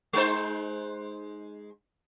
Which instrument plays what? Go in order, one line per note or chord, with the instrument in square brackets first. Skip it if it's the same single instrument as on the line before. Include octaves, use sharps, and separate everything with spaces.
[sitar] G#3 D#4 C5